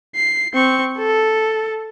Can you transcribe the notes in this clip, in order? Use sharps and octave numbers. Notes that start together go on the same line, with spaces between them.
C7
C4 C#6
A4